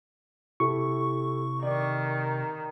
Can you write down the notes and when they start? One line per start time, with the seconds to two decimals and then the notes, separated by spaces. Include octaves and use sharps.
0.60 C3 E4 G4 A4 C#6
1.63 D#3 D5 D6